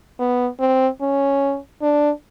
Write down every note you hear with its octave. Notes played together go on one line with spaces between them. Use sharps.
B3
C4
C#4
D4